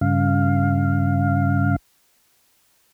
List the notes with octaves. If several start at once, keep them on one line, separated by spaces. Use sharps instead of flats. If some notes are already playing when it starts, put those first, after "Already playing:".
G2 C#3 F5